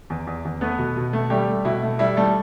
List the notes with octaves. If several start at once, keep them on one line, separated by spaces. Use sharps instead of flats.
E2
E2
E2
A3 B3 B4
B2
B2
A3
G3 A3 G4
A3
B2 E4
A3
G3 E4
G3 A3 A4